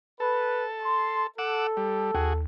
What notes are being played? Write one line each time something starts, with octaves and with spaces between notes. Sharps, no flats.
A4 B4
C6
A4 F#5 D6 E6
G3
D#2 F#4 G#4